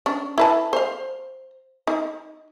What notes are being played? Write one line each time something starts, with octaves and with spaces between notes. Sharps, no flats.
C#4 D4
E4 B4 A5
C5 F5
D#4